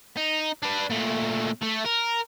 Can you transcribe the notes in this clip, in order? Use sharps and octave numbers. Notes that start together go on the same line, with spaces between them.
D#4
D4 B4
A#2 A3
A3
A#4